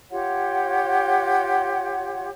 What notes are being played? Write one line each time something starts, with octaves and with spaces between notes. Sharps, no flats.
F4 G4 C#5 F#5